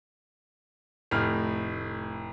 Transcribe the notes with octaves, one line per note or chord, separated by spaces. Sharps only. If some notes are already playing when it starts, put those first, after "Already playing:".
F1 A2 F6